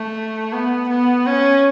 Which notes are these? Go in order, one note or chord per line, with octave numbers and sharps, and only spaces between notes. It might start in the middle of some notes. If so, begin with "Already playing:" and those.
Already playing: A3
B3
B3
C#4